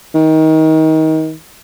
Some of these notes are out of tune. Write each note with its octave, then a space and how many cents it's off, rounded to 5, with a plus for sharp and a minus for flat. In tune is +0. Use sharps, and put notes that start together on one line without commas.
D#3 +25